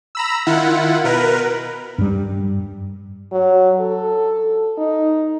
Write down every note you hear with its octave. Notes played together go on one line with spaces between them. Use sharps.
A#5 B5 E6
D#3 E4 F4 F#5
B2 A#4 B4
G2 G3
F#3
A4
D#4